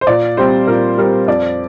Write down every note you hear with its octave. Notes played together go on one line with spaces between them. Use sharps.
C5
A#2 D5
G3 C4 C5
A#2 A#4
G3 C4 A#4
F2 D5